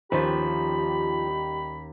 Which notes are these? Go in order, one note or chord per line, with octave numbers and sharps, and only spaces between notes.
D#2 F3 G3 C#4 D#4 G4 B4 B5